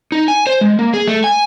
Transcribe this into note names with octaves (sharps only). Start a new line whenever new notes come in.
D#4
G#5
C5
G#3
A#3
G#4
A3
G#5